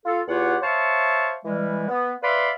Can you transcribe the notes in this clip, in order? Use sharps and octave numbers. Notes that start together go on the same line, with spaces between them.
F4 A4
E2 F4 G4 C#5 F#5
C5 C#5 E5 F5 A5 C#6
E3 G3 G#3
B3
B4 D5 E5 F5 B5 C6